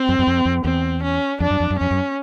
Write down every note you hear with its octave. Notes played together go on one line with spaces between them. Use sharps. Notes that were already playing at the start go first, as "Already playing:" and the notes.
Already playing: C4
F#2
F#2
F2
F2
E2 C4
C#4
F2 D4
F#2
F2
F#2
F2 C#4
F#2